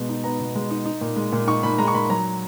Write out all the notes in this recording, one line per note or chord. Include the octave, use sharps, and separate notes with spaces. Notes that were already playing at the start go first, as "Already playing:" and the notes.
Already playing: B2 G#3 B3
D#4
B3 A#5
B2
G#3
D#4
D#4
A#2
G#3
A#2
D#4 C#6
A#2 B5
G#3 A#5
C#6
A#2 B5
F#3 A#5